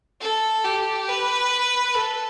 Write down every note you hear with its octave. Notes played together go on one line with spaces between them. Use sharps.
A4
G4
B4
A4